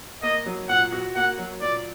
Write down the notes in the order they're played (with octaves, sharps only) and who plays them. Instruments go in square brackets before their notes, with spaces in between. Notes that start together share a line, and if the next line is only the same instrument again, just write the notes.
[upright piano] A#3 [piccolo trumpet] D#5
[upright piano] F#3
[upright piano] A#2 [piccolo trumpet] F#5
[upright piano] F#4
[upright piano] A#3 [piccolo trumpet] F#5
[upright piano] F#3
[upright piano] A#2 [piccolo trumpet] D5